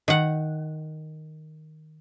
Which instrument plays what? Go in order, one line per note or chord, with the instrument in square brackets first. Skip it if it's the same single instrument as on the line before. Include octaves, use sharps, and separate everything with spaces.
[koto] D#3 F#5